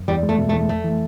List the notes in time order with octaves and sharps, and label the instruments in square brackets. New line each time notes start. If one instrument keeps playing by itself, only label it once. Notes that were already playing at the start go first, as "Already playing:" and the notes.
Already playing: [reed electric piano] F#2
[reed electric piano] E2 [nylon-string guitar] G3
[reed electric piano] G#3
[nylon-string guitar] A3
[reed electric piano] B2
[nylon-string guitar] A3
[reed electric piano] E2
[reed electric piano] F2 [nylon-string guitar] A3
[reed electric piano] E3